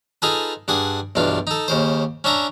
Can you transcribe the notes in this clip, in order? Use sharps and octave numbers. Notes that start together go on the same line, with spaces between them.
D#4 F4 G#4 A4 B4
G2 D4 G#4 F#5
B1 E2 G2 D4 F4
D#4 A4
D#2 C#3 C5
C#4 D4 E5 A#5